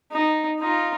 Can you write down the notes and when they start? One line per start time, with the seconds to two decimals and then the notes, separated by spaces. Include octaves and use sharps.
0.12 D#4
0.59 D#4 F4